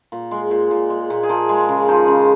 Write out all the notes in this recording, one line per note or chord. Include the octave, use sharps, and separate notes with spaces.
A#2
G#3
A#2
A#2
G#3
A#2
G#4
F3 A#4
G#3 G#4
C#3 F4
F3 D#4
C#3